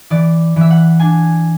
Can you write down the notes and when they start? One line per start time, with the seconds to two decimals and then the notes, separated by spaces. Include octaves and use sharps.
0.10 E3 D5
0.56 E3 E5
0.71 F#5
1.00 D4 G#5